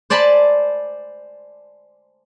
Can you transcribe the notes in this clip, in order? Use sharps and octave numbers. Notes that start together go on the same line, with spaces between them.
C5 D5 G#5 A5 B5 C6